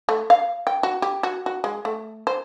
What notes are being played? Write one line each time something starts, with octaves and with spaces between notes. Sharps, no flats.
A3
F5
G5
F#4
G4
F#4
F#4
G#3
A3
C5